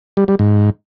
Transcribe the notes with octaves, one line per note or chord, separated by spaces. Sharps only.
G3
G3
G#2